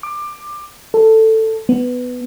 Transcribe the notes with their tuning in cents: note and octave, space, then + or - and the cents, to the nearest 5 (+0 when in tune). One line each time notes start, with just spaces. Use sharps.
D6 +20
A4 +10
B3 +10